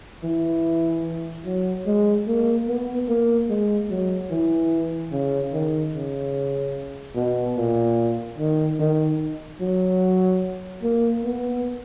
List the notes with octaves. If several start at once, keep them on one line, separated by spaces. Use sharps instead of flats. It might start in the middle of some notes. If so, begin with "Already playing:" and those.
E3
F#3
G#3
A#3
B3
A#3
G#3
F#3
E3
C#3
D#3
C#3
B2
A#2
D#3
D#3
F#3
A#3
B3